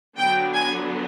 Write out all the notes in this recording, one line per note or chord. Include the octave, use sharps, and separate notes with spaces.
D3 F#3 B3 D4 G5
G#5